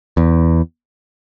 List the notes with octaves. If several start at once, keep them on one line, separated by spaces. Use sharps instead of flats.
E2